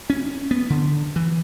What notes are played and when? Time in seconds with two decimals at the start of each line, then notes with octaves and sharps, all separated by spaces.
0.10 C#4
0.51 B3
0.70 D3
1.16 E3